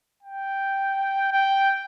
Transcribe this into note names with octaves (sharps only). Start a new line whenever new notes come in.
G5
G5